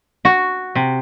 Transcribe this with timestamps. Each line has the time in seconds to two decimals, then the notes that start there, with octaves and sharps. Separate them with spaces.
0.25 F#4
0.75 C3